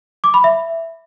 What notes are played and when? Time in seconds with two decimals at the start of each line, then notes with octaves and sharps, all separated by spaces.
0.24 D6
0.34 B5
0.44 E5